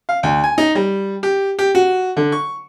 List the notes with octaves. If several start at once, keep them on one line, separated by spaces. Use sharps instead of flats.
F5
D2
G#5
D#4
G3
G4
G4
F#4
D3
C#6